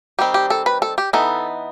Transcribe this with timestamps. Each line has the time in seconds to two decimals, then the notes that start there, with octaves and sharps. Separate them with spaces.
0.19 D#3 G3 C4 G4
0.34 G4
0.50 A4
0.66 B4
0.82 A4
0.98 G4
1.13 E3 B3 D#4 A4